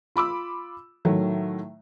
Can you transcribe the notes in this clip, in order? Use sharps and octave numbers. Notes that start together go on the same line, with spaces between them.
F4 B5 D6 E6
A2 D#3 F#3 A3